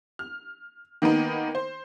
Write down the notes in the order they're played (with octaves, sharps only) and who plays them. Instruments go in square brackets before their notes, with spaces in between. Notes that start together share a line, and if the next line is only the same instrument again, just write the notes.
[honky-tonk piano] F6
D#3 A#3 B3 D#4
C5